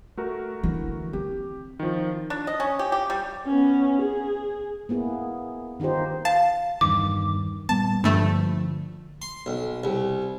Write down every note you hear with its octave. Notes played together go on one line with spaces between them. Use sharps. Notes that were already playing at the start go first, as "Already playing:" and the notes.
A3 F#4 A#4
D3 E3
C4 G4
D#3 F3
D4
D#5
C#4
G4
G4
G3
B3 C#4
G#4
A#3 B3 E4 G#4
D#3 D#4 F4 G4 C5
F5 A5
E2 G2 D#3 D6
A#2 G3 B3 A5
G2 D3 F3 A3
C6
B1
C2